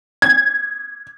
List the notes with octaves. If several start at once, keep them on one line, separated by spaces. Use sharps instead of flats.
G#6